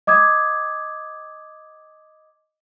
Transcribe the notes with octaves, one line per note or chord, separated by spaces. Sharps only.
D#5 D6 D#6 G#6